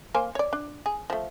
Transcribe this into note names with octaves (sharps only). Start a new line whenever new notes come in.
A#3 C5 G#5
C#5 D5
D4
G#4
F3 A3